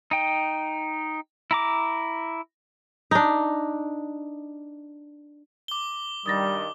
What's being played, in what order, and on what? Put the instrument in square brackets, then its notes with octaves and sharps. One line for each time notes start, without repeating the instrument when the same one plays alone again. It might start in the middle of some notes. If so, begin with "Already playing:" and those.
[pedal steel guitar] D#4 G5
E4 A#5 D6
[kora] D4 D#4
[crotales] D6 G7
[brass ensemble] G2 D#3 [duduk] G3 [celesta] D#6 A6 A#6